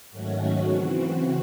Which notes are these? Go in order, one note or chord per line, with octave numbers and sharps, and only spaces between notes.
G#2 D#3 F#3 A3 C#4 F#4
F#4
C#3 E3 C4